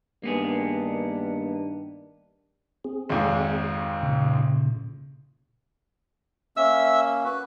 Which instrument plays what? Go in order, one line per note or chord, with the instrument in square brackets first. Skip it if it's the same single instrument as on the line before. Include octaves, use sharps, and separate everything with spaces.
[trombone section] G2 D#3 D4 [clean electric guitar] A#3 B3 G#4
[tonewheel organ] C4 G#4
[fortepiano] G#1 F2 G#2
[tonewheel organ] A#2 C#3
[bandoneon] A#3 C#4 [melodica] E5 E6
[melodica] F#4 [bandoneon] B4